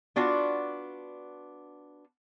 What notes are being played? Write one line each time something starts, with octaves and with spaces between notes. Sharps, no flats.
B3 D4 F4 F#4